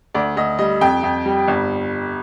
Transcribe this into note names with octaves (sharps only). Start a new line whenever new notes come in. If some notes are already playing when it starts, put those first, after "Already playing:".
D2 D5
D2 D#5
G3 D#5
F2 G5
F2
G3
G1